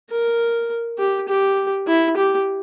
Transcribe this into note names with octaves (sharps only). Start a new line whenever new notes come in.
A#4
G4
G4
E4
G4